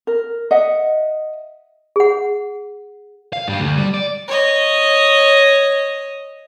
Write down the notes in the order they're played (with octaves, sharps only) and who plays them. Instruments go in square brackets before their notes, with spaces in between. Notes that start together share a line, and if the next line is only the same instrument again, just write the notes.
[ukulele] A#4
D#5 E5 F#5
[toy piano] G#4 F#5
[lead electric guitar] F5
G2 G3
D2
G3
D5
[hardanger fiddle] C#5 D#5